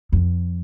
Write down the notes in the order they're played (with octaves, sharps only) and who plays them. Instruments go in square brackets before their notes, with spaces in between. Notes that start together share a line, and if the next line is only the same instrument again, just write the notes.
[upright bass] F2